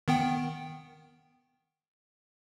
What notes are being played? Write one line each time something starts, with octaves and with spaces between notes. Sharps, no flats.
D#3 B3 G5